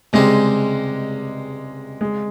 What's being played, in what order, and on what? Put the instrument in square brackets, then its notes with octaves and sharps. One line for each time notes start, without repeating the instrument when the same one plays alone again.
[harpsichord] C#2 C3 G3 C4 D#4 [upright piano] G#3
[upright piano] G#3